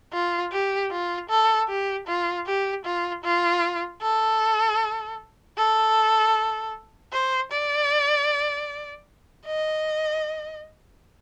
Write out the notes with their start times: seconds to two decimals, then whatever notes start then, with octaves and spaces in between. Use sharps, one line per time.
0.13 F4
0.52 G4
0.91 F4
1.30 A4
1.69 G4
2.07 F4
2.47 G4
2.85 F4
3.24 F4
4.02 A4
5.57 A4
7.13 C5
7.52 D5
9.46 D#5